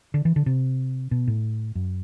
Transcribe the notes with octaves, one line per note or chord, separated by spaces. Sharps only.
D3
E3
D3
C3
B2
A2
F#2